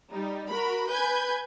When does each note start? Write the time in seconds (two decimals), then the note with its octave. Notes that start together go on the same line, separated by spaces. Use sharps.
0.11 G3 D#4
0.48 F#4 A#4 B5
0.89 B4 G#5 G6 G#6